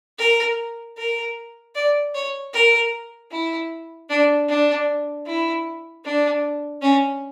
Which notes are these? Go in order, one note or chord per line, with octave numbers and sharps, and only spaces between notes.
A#4
A#4
D5
C#5
A#4
E4
D4
D4
E4
D4
C#4